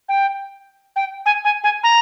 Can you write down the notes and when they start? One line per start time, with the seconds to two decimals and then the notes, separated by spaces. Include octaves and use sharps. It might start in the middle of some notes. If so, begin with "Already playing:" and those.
0.09 G5
0.96 G5
1.26 G#5
1.45 G#5
1.64 G#5
1.83 A#5